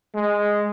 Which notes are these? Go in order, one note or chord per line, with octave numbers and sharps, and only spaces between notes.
G#3